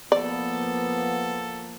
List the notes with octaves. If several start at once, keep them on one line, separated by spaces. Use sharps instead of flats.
F3 A#3 B3 A4 D5